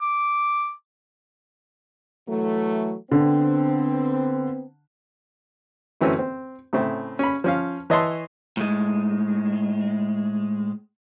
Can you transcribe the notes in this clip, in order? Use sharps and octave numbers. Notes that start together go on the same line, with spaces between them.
D6
E3 F#3 A3
D3 B3 C4
F#2 E3 A3 C4 C#4
C4
A2 C#3 A3 C4
C#4 B5
F3 C#4 F5
E3 C#5 D#5 E5 A5 C6
A2 G#3